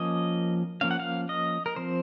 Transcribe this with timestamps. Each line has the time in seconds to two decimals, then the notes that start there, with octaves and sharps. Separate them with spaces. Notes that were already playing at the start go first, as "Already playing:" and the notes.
Already playing: F3 A#3 C#4 D#5
0.81 F3 A#3 C#4 F5
0.91 F#5
1.00 F5
1.29 D#5
1.66 A#4
1.76 F3 C4 C5